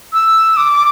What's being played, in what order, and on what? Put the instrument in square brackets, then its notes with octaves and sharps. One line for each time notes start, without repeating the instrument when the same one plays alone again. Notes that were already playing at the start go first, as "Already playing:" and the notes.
[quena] E6
D6